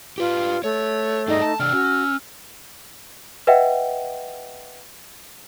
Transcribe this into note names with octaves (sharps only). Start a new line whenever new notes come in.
F4 G4 B4
A3 C#5
G2 D#4 G#4 D5 D#5
A5
C3 D4 G5 E6 F6
C#4 F#4
B4 D#5 E5 F#5 G5